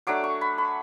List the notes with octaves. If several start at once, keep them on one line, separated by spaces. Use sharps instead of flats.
F#3 A3 D4 D6
C#6
B5
B5